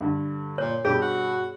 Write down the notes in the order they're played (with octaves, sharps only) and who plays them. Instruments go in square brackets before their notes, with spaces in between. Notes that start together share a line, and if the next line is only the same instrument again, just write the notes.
[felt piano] G2 D3
[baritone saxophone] A#2 [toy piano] C#5
[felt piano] G2 B2 B5 [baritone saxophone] G4 [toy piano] G#4
[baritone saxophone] F#4